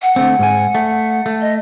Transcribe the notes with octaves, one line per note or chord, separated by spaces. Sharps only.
F#5
D3 A3 C4
G#2 G#5
A3
A3
D#5